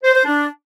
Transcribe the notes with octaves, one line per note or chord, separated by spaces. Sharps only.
C5
C5
D4